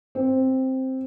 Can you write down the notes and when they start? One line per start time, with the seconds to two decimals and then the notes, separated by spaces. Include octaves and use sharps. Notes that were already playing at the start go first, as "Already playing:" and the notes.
0.15 C4